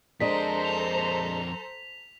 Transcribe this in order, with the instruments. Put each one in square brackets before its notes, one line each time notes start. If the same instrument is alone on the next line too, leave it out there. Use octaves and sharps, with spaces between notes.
[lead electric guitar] F2 A#4 [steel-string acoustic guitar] G#3 D4 [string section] A4 C5 A#5 [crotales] B6
[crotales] B6 F7